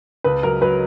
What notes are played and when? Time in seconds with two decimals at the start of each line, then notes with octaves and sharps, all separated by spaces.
0.24 C#2 B4
0.43 F#3 A#4
0.61 F#3 B4